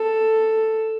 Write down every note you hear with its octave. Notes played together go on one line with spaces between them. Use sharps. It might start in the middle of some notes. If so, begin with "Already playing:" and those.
Already playing: A4